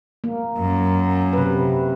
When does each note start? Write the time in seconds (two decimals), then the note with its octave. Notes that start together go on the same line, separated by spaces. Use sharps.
0.24 A#3
0.58 F#2
1.33 C3 B4